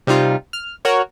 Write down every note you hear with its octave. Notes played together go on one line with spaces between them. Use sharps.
C3 G3 D#4 F4
F6
F#4 A#4 C#5